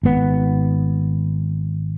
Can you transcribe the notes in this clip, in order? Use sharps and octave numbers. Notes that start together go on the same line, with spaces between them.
G#1 B3